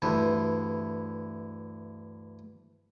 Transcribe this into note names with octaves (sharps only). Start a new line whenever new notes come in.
D2 G2 E3